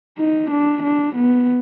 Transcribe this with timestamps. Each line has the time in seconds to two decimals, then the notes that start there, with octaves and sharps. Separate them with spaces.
0.19 D#4
0.51 D4
0.83 D4
1.16 B3